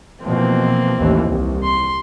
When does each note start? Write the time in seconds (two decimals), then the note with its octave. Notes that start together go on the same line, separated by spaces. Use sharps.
0.25 B2 E3 F3 A#3 C4
0.98 A1 D#2 E3
1.30 C2
1.64 C6